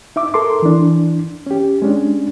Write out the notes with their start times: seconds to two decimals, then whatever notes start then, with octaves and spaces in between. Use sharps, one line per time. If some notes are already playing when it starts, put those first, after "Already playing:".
0.16 D#4 E5 D6
0.34 A4 A#4 C6 D6
0.62 E3 D4
1.46 C#4 G4
1.82 G#3 C#4 D4